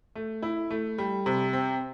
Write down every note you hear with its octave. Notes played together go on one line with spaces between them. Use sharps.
A3
E4
A3
G3
C3
C4